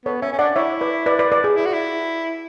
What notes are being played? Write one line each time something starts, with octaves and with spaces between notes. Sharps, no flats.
B3 A4 C#5
C#4 E5 G#5
C#4
D4 D5 F#5
E4 C#5 E5
B4 D5
B4 D5
B4 D5
B4 D5
G#4
E4
F#4
E4